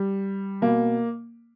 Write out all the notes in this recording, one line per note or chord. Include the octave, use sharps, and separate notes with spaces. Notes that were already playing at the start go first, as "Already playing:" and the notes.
Already playing: G3
B2 A#3